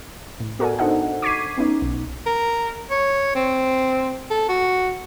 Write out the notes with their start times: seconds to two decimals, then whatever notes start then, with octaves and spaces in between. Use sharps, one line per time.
0.40 A2
0.59 B3 F#4 A4 A#4 D5 G#5
0.79 D4 D#4 A4 C5 D#5 F#5
1.22 C#6 D6 G#6 B6 C7 D#7
1.58 B3 C#4 D#4
1.82 B1
2.26 A#4
2.91 C#5
3.35 C4
4.31 A4
4.49 F#4